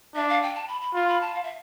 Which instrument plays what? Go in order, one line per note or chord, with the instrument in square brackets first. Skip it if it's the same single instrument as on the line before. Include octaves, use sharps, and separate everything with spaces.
[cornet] D4 [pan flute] E5
[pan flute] F5
G5
A5
B5
B5
[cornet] F4 [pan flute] C6
[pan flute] B5
A5
F5
E5